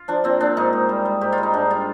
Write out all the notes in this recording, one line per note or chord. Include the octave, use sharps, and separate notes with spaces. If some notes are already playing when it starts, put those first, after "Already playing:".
Already playing: F4
F3 D4
A#2 C4
A#2 D4
G#2 D#4
G#2
G3
G3
G#2 G4
F4
G3
D#4
G#2 D4
G3 F4